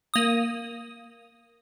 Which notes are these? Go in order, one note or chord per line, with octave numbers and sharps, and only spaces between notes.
A#3 D#6